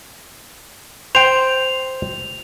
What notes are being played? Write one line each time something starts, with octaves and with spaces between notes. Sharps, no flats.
C5 G5 F7